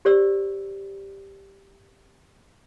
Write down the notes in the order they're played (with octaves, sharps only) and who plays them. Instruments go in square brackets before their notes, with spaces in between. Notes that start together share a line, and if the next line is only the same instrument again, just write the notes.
[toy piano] G4 C5 D5 E6